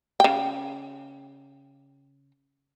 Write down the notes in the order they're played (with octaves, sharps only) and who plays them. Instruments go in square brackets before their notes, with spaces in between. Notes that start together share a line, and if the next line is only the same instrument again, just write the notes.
[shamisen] C#3 G5